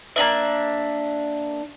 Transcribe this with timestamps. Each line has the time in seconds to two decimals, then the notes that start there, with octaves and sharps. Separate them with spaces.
0.16 A#3 B3 D4 E5